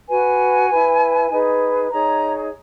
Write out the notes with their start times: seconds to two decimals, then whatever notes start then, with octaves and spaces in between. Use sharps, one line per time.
0.08 F#4 B4 G#5
0.70 E4 B4
1.30 D#4 G#4 B4
1.91 D#4 G#4 C#5 A#5